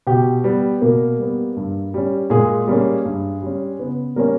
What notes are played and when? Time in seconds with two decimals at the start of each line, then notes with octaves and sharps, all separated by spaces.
0.07 B2 G4 G5
0.44 G3 B3
0.81 B2 A#3 A#4
1.18 G3 B3
1.56 G2
1.94 G3 C#4
2.30 A#2 G#3 G#4
2.67 G3 A#3 C#4
3.05 G2
3.42 G3 C#4
3.79 C#3 B3 B4
4.16 G3 A#3 C#4 A#4